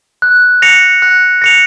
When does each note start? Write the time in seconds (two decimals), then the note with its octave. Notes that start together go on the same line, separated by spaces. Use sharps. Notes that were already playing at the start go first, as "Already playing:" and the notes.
0.22 F#6
0.62 A#6 C#7 F7
1.02 F#6
1.42 A#6 C#7 F7